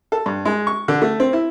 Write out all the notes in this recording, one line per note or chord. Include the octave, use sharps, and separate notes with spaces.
A4
G2
G#3
C#6
D3
A3
C4
E4